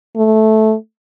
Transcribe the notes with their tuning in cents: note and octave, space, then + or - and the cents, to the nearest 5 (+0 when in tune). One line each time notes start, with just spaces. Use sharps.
A3 -10